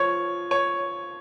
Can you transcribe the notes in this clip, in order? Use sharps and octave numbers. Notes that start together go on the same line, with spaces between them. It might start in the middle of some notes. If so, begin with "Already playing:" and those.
Already playing: F3 C#5
C#5